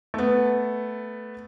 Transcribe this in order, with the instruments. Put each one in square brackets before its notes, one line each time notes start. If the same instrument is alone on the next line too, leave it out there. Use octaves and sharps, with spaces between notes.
[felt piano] A3 B3